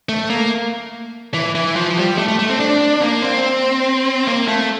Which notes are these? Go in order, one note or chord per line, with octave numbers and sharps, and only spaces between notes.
A3
A#3
E3
E3
F3
G3
A3
A3
A3
C4
D4
A#3
C4
A#3
A3